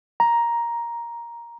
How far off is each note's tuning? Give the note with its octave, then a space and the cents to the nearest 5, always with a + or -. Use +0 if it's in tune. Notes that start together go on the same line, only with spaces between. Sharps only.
A#5 +10